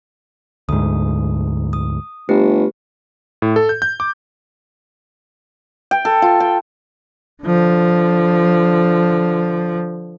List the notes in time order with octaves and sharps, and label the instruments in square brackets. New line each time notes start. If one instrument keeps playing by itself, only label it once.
[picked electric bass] D2 G#2 [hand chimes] D#6
[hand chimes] D#6
[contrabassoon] G1 [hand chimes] A3 G4 B4
[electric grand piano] A2
A4
G6
G6
D6
[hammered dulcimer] G5
A4
F4
G5
[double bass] D3 F3